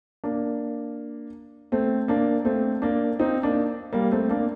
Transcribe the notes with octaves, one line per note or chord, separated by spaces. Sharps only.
A#3 D4
A3 C4
A#3 D4
A3 C4
A#3 D4
C4 D#4
A#3 D4
G3 A#3
A3 C4
A#3 D4